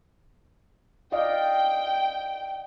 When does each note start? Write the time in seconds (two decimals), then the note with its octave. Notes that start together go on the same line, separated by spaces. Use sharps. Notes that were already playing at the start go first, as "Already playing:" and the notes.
1.12 D5 D#5 F5 G5